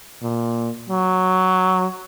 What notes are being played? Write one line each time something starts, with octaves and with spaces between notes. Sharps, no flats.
A#2
F#3